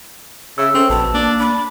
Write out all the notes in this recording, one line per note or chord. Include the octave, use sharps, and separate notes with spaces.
C#3 E5 E6
C4 C#4 A4
A#1 B2 A5
A#3 D4
D4 B5